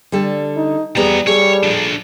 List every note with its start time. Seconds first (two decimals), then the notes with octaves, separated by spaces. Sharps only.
0.12 D3 G3 A4
0.56 D#4
0.96 E2 F3 G3 B3 G#4 A#5
1.27 G3 G#4 A4 C#5
1.63 F3 D4